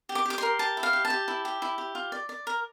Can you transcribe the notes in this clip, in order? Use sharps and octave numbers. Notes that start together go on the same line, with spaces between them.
G4
D6
G4 D6
A#4 C6
G4 A5
E4
F5
G4
A5
G4
E4
G4
E4
G4
F4
D5
D5
A#4